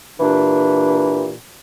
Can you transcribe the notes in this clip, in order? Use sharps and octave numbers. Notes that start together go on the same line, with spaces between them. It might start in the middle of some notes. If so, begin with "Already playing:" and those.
A#2 E3 D4 G4